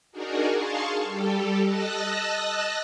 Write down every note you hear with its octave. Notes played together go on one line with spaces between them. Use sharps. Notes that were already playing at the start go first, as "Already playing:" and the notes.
D4 D#4 F#4 G#4 A#4
G#4 F5 A5 C6 C#6
G3 G4 A4
D#5 A5 E6 F#6 A#6